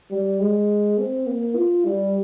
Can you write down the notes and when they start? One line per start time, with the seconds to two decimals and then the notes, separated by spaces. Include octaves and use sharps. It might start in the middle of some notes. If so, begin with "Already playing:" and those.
0.11 G3
0.40 G#3
0.98 C4
1.26 A#3
1.55 F4
1.85 G3